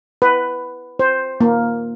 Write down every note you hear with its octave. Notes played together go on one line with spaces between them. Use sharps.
B4
C5
A#3